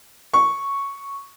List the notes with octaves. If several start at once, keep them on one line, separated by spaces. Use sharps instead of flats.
C#6